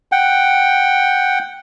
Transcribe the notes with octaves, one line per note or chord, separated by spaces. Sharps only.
F#5 G5